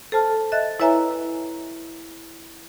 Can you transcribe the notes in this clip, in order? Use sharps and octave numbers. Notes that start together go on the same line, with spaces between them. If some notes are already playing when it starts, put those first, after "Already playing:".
A4 C5 A5 F6
D#5 E5 F#6 A6
E4 B4 C#5 E5 G#5 A#5